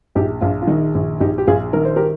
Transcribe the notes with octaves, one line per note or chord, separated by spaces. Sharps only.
A#1 D#4 G4
A#1 D4 F4
F4
D#3 D#4
A#1
A#1 D#4 G4
G4
A#1 F4 G#4
D#3 A#4
C5
G4 A#4